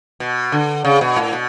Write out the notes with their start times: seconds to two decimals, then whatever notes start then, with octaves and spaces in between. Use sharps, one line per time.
0.20 B2
0.52 D3
0.85 C#3
1.01 B2
1.17 A2
1.33 B2